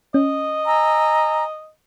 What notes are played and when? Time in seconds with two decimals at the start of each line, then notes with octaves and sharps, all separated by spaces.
0.14 C#4 D#5
0.65 G#5 A#5 E6